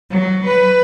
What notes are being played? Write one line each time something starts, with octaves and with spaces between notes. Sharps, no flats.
F#3
B4